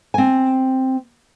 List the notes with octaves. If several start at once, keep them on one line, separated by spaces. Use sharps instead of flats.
C4 G#5